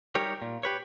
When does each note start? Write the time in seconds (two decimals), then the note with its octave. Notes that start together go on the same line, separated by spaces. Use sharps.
0.15 G3 D#4 G4 A#4 C#5
0.42 A#2
0.63 G4 B4 C#5